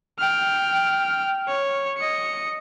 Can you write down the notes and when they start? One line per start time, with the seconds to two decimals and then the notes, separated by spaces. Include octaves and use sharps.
0.19 G5 F6
1.47 C#5
1.98 D#5 C#7